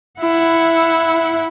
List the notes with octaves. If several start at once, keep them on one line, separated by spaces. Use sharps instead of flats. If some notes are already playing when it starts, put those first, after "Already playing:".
E4 F#5